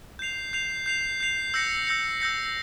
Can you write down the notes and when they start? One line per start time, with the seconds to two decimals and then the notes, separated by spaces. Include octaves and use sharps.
0.19 G6 C7 F7
0.53 G6 C7 F7
0.86 G6 C7 F7
1.20 G6 C7 F7
1.54 E6 G6 A#6 C#7
1.87 E6 G6 A#6 C#7
2.20 E6 G6 A#6 C#7